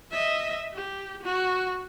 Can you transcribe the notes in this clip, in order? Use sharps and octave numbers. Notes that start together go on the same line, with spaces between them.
D#5 E5
G4
F#4